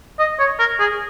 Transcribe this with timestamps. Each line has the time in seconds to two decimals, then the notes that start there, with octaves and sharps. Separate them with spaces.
0.19 D#5
0.39 C#5
0.59 A#4
0.79 G#4